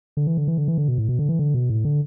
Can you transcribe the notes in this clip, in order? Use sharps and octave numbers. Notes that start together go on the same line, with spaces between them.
D3
E3
D3
E3
D3
E3
D3
B2
A2
B2
D3
E3
D3
B2
A2
D3